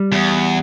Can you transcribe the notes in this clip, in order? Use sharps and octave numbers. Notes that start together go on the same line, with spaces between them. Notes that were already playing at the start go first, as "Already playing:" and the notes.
Already playing: G3
E2